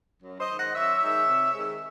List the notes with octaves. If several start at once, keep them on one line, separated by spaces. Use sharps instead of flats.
F#2
C5 D#5
D#3 G#3 D#4
D#5 F#5
F#2 C#5 E5
D#3 G#3 D#4
C3
D#3 G#3